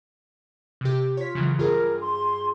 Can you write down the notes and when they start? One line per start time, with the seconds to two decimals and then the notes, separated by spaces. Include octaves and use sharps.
0.81 C3 G4
1.17 F4 C#5 B6
1.35 C#3 E3 F#3
1.58 G2 F4 G#4 A#4
2.01 C6